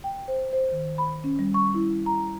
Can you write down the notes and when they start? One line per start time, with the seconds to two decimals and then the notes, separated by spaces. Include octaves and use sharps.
0.04 G5
0.28 C5
0.53 C5
0.72 D#3
0.98 B5
1.24 C#4
1.39 G3
1.54 C#6
1.74 E4
2.06 A#5